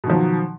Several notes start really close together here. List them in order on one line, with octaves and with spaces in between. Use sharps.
B2 D#3 F3 F#3